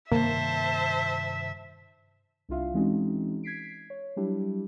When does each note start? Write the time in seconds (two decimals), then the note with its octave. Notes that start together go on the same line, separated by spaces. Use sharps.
0.12 G2 C3 D#3 A#3 C5 E5 A5
2.49 C2 D4 E4 F4 E5 F5
2.74 E3 G#3 C4 C#4 D#4 F#4
3.43 G#6 B6 C7 D7
3.90 C#5
4.16 F#3 G3 D4 E4 G4